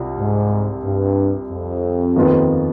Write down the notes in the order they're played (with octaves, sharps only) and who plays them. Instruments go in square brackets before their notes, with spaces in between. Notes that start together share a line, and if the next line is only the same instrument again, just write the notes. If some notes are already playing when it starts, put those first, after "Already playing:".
Already playing: [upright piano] C2 C3 G3 F4
[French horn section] G#2
G2
F2
[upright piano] D#2 D#3 B3 F4